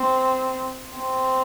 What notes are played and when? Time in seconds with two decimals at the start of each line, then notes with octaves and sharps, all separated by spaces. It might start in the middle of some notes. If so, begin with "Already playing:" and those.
Already playing: C4
0.97 C4